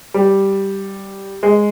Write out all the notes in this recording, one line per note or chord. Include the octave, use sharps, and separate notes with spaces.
G3
G#3